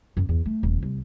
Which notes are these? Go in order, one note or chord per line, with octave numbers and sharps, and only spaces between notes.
F#2
E2
A3
D#1
C2